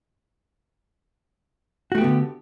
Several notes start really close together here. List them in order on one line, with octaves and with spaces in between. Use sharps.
F#4 A3 G4 B3 D3